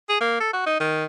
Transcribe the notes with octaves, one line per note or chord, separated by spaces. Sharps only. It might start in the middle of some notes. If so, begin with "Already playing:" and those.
G#4
A#3
A4
F#4
D#4
D#3